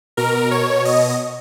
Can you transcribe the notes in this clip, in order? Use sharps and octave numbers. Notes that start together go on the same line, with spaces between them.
B2 A#4
C#5
D#5